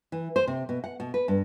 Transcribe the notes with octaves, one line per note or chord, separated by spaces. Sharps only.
E3
C5
C3
B2
F#5
B2
B4
G2